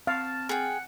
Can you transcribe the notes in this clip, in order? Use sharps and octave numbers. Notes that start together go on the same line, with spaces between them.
C4 F5 A5 F6 A6
G#4 F#5 G5